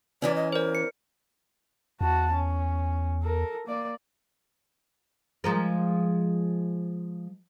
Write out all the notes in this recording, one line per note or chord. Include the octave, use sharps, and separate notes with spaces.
E2 E3 C#4 D5
D#5
A#4 C5 D5
C#7
E2 F#4 A5
C#4
A4 A#4
A#3 D5
F3 G#3 A#4